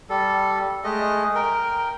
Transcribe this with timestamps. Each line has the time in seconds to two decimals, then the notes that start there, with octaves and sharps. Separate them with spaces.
0.10 G3 A4
0.84 G#3 A3 D#5
1.35 A#4 G5